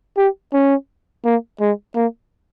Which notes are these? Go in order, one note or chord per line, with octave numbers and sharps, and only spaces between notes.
G4
C#4
A#3
G#3
A#3